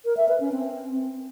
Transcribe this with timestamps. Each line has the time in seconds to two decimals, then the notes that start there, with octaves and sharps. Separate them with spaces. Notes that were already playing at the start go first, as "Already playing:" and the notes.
0.05 A#4
0.17 E5
0.29 B4
0.40 C#4
0.52 C4